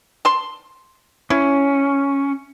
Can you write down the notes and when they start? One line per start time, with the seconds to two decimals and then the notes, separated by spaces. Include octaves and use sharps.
0.25 A5 C6
1.30 C#4 E4